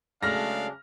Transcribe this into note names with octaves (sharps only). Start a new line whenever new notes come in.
C#3 F#3 G#3 A3 D4 F5 F6 A#6